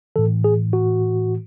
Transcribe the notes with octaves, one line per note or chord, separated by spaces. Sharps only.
A2 E3 A4
G#4
F#4